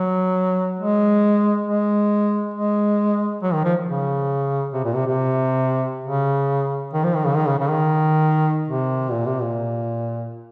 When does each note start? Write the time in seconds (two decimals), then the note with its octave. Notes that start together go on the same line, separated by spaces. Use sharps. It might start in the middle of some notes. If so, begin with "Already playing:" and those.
Already playing: F#3
0.79 G#3
1.67 G#3
2.54 G#3
3.43 F#3
3.53 D#3
3.64 F3
3.86 C#3
4.74 C3
4.85 A#2
4.95 C3
5.07 C3
6.05 C#3
6.93 D#3
7.04 F3
7.15 D#3
7.25 C#3
7.36 D#3
7.48 C#3
7.59 C#3
7.70 D#3
8.69 C3
9.11 A#2
9.26 C3
9.41 A#2